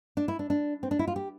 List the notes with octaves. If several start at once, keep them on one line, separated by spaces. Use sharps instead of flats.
D4
E4
D4
D4
C4
D4
E4
F4
G4